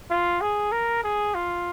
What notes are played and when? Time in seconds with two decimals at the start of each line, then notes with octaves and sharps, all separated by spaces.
0.11 F4
0.41 G#4
0.72 A#4
1.04 G#4
1.35 F4